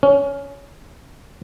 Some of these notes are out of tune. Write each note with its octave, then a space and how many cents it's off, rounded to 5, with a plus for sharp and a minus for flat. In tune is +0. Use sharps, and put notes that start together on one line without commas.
C#4 +15